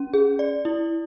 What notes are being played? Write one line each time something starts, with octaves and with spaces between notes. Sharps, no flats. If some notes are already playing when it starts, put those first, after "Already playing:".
Already playing: C#4
G#4
D5
E4